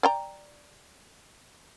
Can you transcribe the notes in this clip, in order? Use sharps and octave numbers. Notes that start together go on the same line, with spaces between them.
D5 G5 A#5